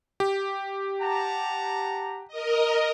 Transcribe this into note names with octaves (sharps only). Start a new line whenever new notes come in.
G4
F#5 A5 A#5
A#4 D#5